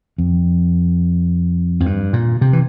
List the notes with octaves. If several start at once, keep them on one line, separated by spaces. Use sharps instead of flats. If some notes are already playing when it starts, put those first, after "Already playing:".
F2
F2
G2
A#2
C3
E3